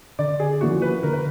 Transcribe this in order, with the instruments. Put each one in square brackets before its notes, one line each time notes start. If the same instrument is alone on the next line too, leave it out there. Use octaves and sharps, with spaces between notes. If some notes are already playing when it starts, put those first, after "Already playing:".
[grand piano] D3 [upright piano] D5
[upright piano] G#4
[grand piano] F3 A#3 C#4 E4 [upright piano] F#4
[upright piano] B4
[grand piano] D3 [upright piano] A#4
[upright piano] B4